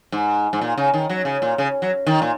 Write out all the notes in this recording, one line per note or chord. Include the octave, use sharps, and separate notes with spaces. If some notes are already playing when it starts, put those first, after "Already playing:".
G#2
G#2
A#2
C#3
D#3
F#3
C#3
A#2
C#3
F#3
D#3
A#2